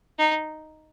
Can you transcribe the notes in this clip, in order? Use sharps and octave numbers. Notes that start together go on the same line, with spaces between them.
D#4